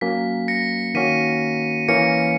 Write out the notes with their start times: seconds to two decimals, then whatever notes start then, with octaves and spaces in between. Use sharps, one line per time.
0.01 F#3 A#3 C#4 B6
0.48 A#6 C#7
0.94 D#3 A#3 C#4 F#4 B6 D#7
1.88 E3 A#3 C#4 A#6 C#7